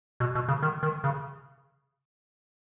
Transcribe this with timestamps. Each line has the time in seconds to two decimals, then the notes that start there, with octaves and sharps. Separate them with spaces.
0.20 B2
0.35 B2
0.48 C#3
0.63 D#3
0.83 D#3
1.04 C#3